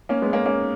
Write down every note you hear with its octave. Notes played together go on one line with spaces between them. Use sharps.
A#3 C#4
G#3 B3
A#3 C#4
A#3 C#4